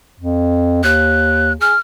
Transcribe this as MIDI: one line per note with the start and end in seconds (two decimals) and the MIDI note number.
0.21 0.82 41
0.84 1.54 39
0.84 1.53 90
1.61 1.74 68
1.61 1.79 89